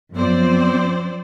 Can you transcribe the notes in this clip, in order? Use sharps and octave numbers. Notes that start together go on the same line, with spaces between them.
F#2 F3 B3 C4 C5 D5